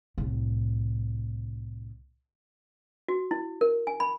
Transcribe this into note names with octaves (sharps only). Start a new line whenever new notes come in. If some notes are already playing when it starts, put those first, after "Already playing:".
C2 A2
F#4
E4
A#4
G#5
B5